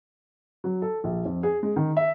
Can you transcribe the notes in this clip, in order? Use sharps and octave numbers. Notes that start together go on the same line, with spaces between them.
F#3
A4
A#1
F2
G#4
G#3
D#3
E5